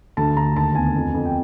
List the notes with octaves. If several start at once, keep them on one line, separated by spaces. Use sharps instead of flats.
D2 A5
D2 A#5
D#2 A5
B3 G#5
F2
F2
G5